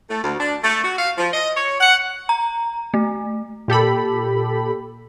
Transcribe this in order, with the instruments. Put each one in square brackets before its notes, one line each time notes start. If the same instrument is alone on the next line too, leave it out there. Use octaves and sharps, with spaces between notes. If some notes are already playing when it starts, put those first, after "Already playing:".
[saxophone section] A3
D2
D4
A3
F#4
F5
F3
D#5
C#5
F#5
[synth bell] A#5
A3
[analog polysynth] A#2 G4 A4 B5